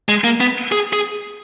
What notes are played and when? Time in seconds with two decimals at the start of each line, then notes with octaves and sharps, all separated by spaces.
0.09 G#3
0.24 A#3
0.41 B3
0.72 G#4
0.93 G#4